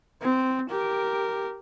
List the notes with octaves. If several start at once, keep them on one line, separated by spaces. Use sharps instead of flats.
C4
G4 A#4